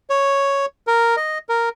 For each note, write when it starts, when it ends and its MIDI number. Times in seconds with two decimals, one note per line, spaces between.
0.10 0.66 73
0.87 1.16 70
1.17 1.38 75
1.49 1.69 70